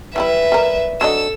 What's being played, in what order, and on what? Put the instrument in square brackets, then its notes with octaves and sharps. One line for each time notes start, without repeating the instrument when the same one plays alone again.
[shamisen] E3 G3 E4 [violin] B4 E5
[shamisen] G3 A#4
[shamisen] F#3 D4 D#5 [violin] A4 E6